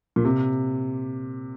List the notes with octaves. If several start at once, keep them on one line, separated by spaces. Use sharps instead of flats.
A#2
C3